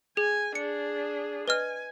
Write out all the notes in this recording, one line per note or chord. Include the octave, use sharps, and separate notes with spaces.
G#4 G#5
D4 G#4 C#7
B4 D#5 G#5 F6